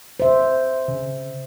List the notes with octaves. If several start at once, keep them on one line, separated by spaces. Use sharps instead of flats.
C5 E5
C#3